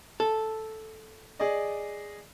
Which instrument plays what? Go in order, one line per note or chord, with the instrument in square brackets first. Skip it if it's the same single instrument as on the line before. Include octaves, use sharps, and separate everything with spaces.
[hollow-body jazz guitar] A4
[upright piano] G#4 D5 D#5